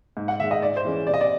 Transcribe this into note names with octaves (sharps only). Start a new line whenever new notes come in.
G#2
F#5
D#3 G#3 E5
D#5
G#2 D5
C5
E3 G#3 C#4
C3 D5
D#5
D5